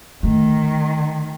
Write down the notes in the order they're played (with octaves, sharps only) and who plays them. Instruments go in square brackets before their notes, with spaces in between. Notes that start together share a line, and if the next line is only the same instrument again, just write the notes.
[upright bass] D3 A3 [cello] D#3